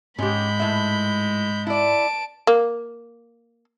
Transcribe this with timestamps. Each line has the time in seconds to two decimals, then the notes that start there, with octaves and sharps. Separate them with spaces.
0.19 G#2 G#3 C#4 G4 B5 G6
0.60 A2 E5
1.67 E4 D5 A5 D7
2.47 A#3